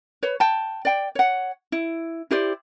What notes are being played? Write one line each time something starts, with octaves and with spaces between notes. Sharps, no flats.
B4 C#5
G5 A5
D5 G5
C#5 F#5
E4
E4 G4 C5 D5